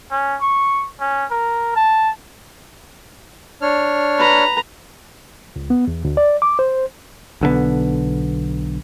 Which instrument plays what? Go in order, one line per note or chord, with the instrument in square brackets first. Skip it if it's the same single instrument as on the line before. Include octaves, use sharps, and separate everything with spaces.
[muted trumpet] C#4
C#6
C#4
A#4
A5
[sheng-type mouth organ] D4 C#5 F6
[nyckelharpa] B4 A#5
[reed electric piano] C#2
B3
E2
D2
D5
D6
C5
[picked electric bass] B1 D3 F3 B3